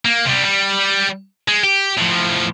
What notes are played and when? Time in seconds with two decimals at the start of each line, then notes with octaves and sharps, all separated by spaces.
0.05 A#3
0.25 C3 G3
0.45 G3
1.48 G#3
1.64 G4
1.98 A2 F3